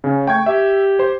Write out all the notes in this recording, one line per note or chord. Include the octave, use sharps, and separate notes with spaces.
C#3 C#4
A3 G5 C#6 G#6
G4 E5
C5 C6